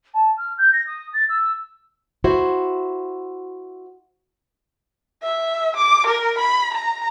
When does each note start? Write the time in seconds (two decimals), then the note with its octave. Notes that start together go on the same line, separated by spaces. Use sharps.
0.14 A5
0.37 F6
0.57 G6
0.72 A#6
0.86 D#6
1.13 A6
1.29 E6
2.24 E4 F#4 C5
5.23 E5
5.77 D6
6.07 A#4
6.39 B5
6.74 A#5